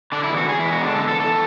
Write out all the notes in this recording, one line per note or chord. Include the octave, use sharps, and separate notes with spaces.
D3 D4
E4
E2
F#4
E2 G#4
E4
G#3
F#4
D3 D4
A4
E2
A4
E2 A4